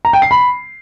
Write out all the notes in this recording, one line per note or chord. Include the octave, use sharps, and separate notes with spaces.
A#5
G5
C7
B5